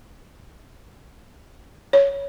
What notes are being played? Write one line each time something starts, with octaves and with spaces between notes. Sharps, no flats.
C#5